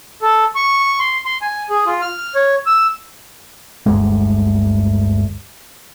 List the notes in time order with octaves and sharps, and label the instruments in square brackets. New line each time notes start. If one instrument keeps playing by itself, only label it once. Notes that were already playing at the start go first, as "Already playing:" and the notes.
[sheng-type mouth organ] A4
C#6
C6
C6
G#5
G#4
F4
F6
C#5
E6
[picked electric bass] G1 D2 G#3